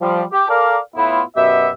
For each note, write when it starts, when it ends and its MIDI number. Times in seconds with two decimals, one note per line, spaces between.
0.01 0.23 53
0.01 0.23 55
0.32 0.48 67
0.49 0.77 69
0.49 0.77 70
0.49 0.77 74
0.49 0.77 77
0.96 1.22 45
0.96 1.22 59
0.96 1.22 64
0.96 1.22 65
1.36 1.70 42
1.36 1.70 47
1.36 1.70 59
1.36 1.70 67
1.36 1.70 76